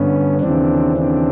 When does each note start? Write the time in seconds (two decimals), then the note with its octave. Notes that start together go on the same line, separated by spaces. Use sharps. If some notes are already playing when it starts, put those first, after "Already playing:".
Already playing: G2 D3 B3 C#4
0.41 D#2 C#3 E3 C4 D4
0.97 C4 D4